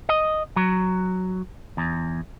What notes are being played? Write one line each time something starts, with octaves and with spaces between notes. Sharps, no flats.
D#5
F#3
E2